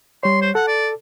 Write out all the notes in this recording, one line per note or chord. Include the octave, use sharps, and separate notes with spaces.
G3 C#5 C6
C5
A4 F#5
D5